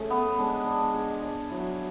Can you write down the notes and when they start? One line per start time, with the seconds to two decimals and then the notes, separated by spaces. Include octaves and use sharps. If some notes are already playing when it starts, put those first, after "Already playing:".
Already playing: A3 C#4 G#4
0.10 B3
0.39 G#3 D4
0.67 D4
0.94 G#4
1.23 D5
1.50 F#3 E4